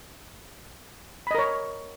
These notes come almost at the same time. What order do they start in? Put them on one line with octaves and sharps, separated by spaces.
B5 D#5 A#4 C#5